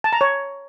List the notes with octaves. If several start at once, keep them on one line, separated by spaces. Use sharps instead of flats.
A5
A#5
C#5